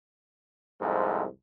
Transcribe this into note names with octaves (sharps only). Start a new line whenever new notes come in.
C2 F2 G#2